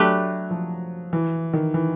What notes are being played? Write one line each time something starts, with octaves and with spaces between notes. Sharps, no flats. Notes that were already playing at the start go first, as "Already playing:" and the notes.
Already playing: F#3 A3 D4 G4 B4
F3
E3
D#3
E3